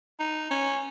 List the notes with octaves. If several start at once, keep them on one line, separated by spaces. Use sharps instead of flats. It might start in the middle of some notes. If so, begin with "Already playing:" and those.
D#4
C#4